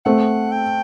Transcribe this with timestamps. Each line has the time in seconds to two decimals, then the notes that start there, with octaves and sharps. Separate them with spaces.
0.05 A3 C4 F#5
0.52 G5